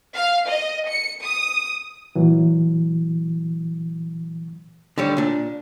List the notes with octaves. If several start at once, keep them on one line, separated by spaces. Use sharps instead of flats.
F5
D#5
C#7
D#6
A#2 E3 F#3
D3 G3 C#5
A#2 D4